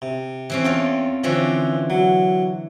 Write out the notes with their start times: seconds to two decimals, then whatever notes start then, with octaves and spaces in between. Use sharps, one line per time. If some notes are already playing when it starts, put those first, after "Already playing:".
0.02 C3
0.50 E3 C4 C#4
0.65 E2 F4 A4 G5
1.24 D3 E3 F3 C4 C#4
1.90 F#3